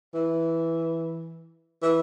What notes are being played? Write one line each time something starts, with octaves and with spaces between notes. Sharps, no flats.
E3
E3